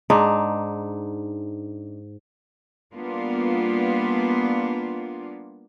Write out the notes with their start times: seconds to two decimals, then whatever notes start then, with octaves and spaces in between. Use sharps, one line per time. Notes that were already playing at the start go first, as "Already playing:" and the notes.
0.10 G#2 D4 D#4
2.93 G3 A#3 B3 D4 F4